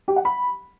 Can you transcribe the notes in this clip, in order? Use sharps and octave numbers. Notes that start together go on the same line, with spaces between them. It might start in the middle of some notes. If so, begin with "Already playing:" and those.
G4
F#5
B5